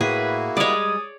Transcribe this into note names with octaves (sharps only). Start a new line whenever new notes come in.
A2 A#3 E4 F#4 G#4 B4
G3 G#3 C#5 D5 D#6